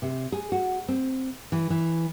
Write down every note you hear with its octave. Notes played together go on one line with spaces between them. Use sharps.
C3
G#4
F#4
C4
E3
E3